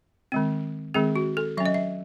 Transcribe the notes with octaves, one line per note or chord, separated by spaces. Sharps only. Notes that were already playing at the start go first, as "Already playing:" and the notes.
D#3 G#3 C4
D#3 G#3 C4 G#4
F#4
A4
F#3 C#4 E5
D#5
E5